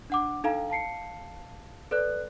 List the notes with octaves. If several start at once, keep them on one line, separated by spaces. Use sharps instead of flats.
D4 F#5 D6
D4 D#4 A4 F5 G5 A#5
F5 A5 C7 C#7
A4 B4 D5 F#6